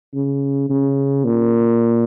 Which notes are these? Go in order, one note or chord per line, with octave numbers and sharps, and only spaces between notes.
C#3
C#3
A#2